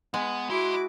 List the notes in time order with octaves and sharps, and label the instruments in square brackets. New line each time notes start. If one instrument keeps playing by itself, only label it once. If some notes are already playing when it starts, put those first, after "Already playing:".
[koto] G#3 [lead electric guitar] B3
[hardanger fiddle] E4 D6 [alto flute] F#4 [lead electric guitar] D#5 C6